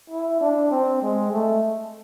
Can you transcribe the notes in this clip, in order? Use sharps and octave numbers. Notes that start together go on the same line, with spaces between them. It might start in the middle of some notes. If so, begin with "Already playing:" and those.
E4
D4
C4
G#3
A3